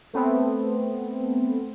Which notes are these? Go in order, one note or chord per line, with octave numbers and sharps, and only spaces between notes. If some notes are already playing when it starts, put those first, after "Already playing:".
A3 B3 C4